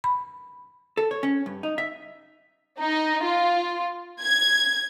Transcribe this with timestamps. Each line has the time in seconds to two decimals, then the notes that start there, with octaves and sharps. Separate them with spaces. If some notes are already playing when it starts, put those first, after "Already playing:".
0.04 B5
0.97 A4
1.11 C#5
1.23 C#4
1.46 G2
1.63 D#4
1.78 E5
2.79 D#4
3.25 F4
4.20 G#6